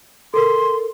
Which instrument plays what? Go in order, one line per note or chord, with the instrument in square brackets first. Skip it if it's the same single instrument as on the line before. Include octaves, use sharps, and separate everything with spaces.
[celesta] A4 A#4 [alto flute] C6